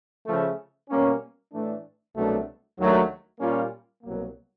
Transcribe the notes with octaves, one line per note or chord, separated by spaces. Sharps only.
C#3 F3 A3
B2 G3 A#3 C#4
A2 E3 A3 D4
C2 B2 F#3 A3 D4
D#2 D#3 F#3 A3 D4
A#2 G3 A#3 C#4 F4
C2 B2 F#3 A#3